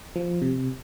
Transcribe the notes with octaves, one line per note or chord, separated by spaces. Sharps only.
F3
C3